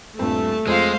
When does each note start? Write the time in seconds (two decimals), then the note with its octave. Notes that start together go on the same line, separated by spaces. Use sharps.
0.19 D#1 G2 A3 C4 A5
0.67 F2 G#3 C5 F5